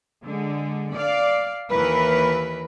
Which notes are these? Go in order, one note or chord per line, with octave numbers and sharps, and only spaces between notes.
D3 G#3
D5 F5
D#2 E3 A#4 B4